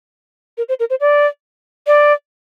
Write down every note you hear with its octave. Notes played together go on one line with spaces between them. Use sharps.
A#4
C5
A#4
C5
D5
D5